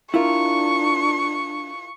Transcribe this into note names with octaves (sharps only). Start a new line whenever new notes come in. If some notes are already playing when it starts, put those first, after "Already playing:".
D4 E4 F4 A#4 C#6